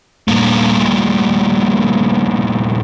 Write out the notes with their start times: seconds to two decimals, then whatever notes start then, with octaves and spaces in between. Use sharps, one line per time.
0.28 G2 A#2